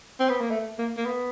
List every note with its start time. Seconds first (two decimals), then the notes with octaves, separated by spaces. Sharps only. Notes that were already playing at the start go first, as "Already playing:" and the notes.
0.20 C4
0.29 B3
0.40 A#3
0.51 A3
0.79 A#3
0.97 A#3
1.06 B3